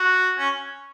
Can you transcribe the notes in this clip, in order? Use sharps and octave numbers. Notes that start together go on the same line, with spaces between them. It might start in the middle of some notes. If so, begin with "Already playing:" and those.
Already playing: F#4
C#4